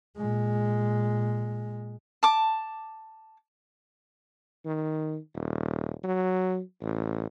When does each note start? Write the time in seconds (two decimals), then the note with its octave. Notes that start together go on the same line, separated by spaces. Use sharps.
0.18 A#2 G#3
2.23 A5 D6
4.65 D#3
5.35 D#1
6.04 F#3
6.82 A1